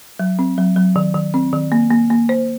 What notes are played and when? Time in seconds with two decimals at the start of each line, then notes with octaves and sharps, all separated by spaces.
0.19 F#3
0.39 C4
0.58 F#3
0.76 F#3
0.96 D#3
1.15 D#3
1.34 C4
1.53 D#3
1.72 A#3
1.90 A#3
2.10 A#3
2.29 C5